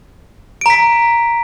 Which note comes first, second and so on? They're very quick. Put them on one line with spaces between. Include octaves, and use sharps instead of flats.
D7 A#5 B6